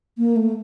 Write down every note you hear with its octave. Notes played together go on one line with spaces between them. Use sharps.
A#3
A3